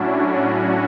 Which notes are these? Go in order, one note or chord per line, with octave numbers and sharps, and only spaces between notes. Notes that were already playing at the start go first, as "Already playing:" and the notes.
Already playing: A2 F#3 C#4 D4 E4 F#4
C#4